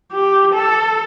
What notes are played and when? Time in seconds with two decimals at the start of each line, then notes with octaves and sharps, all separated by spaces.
0.13 G4
0.53 A4